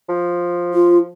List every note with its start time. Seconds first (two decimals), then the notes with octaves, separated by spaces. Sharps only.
0.09 F3
0.74 F4